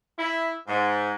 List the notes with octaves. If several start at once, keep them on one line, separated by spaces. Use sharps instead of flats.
E4
G#2